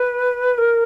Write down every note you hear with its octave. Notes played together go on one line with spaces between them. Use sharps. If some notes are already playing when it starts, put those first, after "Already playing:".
Already playing: B4
A#4